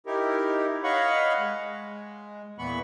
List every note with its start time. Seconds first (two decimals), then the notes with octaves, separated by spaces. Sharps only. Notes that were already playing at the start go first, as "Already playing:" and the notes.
0.06 D#4 E4 G4 A#4
0.84 C#5 D#5 F5 F#5 B5 C#6
1.39 G#3
2.58 E2 A#2 E3 B3 B5 C#6